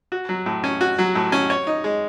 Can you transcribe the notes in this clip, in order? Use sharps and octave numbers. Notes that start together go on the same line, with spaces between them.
F#4
F#3
A2
C#4
F#4
F#3
A2
C#4
C#5
D#4
G#3